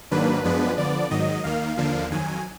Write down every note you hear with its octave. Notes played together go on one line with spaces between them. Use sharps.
G#2 D#3 F#3 A#3 D4 B4
F#2 F3 G#3 B3 D4
D3 F3 B3 D5
G#2 D#3 F#3 D#5
D#2 D#3 A#3 F5
D#2 D3 F3 A#3 D4
F2 D#3 F#3 G#5